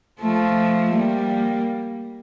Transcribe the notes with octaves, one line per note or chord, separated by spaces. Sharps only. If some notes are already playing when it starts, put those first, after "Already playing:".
F3 A3
G3 A#3